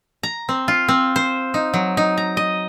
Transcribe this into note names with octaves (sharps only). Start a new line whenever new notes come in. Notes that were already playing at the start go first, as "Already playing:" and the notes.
A#5
C4
F4
C4
C5
D#4
F#3
D#4
A#5
D#5